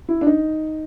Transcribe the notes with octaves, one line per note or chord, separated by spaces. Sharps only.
E4
D4
D#4